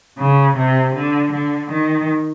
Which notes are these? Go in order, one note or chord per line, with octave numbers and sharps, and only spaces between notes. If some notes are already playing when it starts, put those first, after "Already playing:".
C#3
C3
D3
D3
D#3